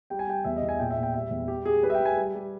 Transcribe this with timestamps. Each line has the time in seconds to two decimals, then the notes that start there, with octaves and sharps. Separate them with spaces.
0.10 G3 G5
0.19 G#5
0.27 G3 G5
0.44 E2 E5
0.56 D#5
0.63 E2
0.69 G#5
0.75 E5
0.79 A#2 G5
0.91 E5
0.97 A#2
1.03 G5
1.14 G3 E5
1.31 E2
1.48 G3 G4
1.65 G3 G#4
1.82 G3 B4
1.90 E5
1.95 G5
2.00 G3
2.05 G#5
2.17 G3
2.35 G3